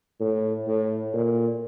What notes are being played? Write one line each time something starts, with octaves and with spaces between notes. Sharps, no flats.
A2
A2
A#2